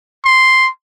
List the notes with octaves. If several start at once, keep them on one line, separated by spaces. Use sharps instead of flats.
C6